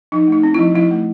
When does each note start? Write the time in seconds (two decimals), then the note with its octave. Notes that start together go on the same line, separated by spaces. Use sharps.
0.12 F3 D#4
0.27 A3 D#4
0.43 C4
0.54 F3 E4
0.75 F3 E4
0.91 A3